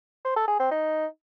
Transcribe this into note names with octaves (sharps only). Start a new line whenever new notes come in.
C5
A4
G#4
C4
D#4